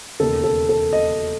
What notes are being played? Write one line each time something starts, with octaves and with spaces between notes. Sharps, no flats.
E1 D#2 C#3 A4
A4
A4
D#5